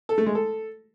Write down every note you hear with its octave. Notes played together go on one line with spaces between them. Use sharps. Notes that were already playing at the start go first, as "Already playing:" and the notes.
A4
A3
G#3
A4